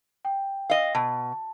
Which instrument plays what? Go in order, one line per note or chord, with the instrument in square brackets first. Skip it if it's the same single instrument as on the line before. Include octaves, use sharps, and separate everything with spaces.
[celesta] G5
[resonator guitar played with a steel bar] D#5 F5
[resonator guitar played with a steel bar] B2 [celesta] A5